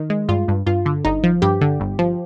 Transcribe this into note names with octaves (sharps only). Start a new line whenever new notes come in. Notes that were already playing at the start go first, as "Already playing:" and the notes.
Already playing: D#3
G#3
G2 F4
G2
G2 F4
D3
G1 D#4
F3
G2 G4
D3
G1
F3